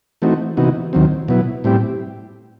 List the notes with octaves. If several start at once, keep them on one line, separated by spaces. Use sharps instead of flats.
E3 A3 C4 D#4 F#4
C3 E3 B3 D#4 F#4
D#2 D#3 F#3 C4
B2 F#3 B3 E4
A2 G3 C4 E4 G4